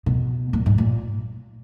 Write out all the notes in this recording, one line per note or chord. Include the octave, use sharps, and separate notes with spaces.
B2
A#2
G#2
A#2